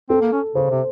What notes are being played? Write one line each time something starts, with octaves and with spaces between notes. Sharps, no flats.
C4 A4
A#3
C#4
C#3 C5
C3